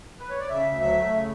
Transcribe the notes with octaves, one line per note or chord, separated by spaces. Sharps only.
B4
C#5
D5
C#3 E5
D2
F#3 E5
A3
C#3